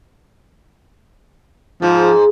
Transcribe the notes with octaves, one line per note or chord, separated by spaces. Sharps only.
G#2 F3